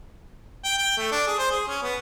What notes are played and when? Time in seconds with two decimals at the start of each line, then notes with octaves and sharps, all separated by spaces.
0.64 G5
0.78 G5
0.97 A3
1.11 D4
1.27 G#4
1.39 C5
1.52 G#4
1.68 C#4
1.82 B3